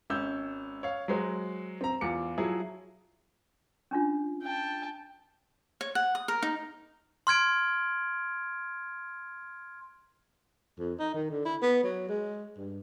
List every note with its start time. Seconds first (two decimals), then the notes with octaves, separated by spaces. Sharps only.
0.10 G#1 C#4 E6 G6
0.83 C#5 F5
1.08 F#3 G#3 C5
1.81 C4 A#5
2.01 E2 F4 D6 C#7
2.38 F3 F#3 E4 G#4
3.91 C#4 D4 F4
4.43 G5 A5
5.81 C#5
5.95 F#5
6.15 D#6
6.28 A#4
6.43 D#4
7.27 C6 F6 G#6 D7
10.78 F2
10.99 D#4
11.14 D#3
11.30 D3
11.45 E4
11.62 B3
11.83 F#3
12.09 G#3
12.57 G2